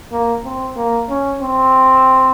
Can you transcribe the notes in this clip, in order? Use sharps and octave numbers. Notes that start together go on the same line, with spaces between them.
A#3
C4
A#3
C#4
C4